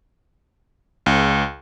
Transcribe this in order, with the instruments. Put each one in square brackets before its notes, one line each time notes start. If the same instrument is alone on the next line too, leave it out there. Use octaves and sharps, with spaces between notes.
[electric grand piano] C#2